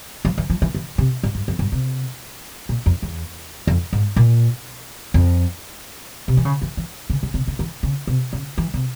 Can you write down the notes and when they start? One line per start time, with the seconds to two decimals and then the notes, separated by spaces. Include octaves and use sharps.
0.25 F3
0.38 E3
0.50 F3
0.62 E3
0.75 E3
0.98 C3
1.23 G#2
1.35 G2
1.48 F2
1.59 G2
1.72 C3
2.69 A#2
2.86 F2
3.02 E2
3.67 F2
3.93 G#2
4.16 A#2
5.14 F2
6.28 C3
6.37 E3
6.45 C#3
6.62 E3
6.77 E3
7.10 C#3
7.23 C#3
7.34 C3
7.47 C#3
7.59 E3
7.83 C#3
8.07 C3
8.33 C#3
8.58 E3
8.74 C3